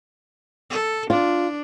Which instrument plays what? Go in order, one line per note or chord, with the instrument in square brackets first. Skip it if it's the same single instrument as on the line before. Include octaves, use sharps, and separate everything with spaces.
[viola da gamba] A4
[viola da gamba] D4 [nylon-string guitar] F4